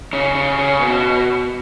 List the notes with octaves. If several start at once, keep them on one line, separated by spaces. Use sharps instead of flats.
C#3
C#3
C#3
B2